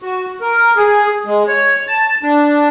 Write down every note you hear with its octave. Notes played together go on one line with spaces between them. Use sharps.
F#4
A#4
G#4
G#3
C#5
A5
D4